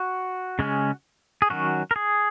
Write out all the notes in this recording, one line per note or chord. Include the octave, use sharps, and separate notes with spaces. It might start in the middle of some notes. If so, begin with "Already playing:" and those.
Already playing: F#4
C#3 G#3 C#4
G#4
D#3 F#3 C#4 F#4
A#4
G#4